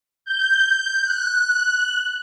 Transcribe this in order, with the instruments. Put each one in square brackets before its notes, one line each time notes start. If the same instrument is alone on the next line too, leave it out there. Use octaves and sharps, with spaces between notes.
[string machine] G6
F#6